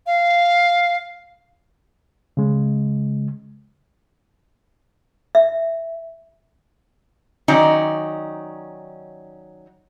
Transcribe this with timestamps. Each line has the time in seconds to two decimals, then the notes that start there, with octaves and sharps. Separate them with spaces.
0.07 F5
2.37 C#3 G#3
5.35 E5
7.48 D#3 F#3 C#4 D#4 D5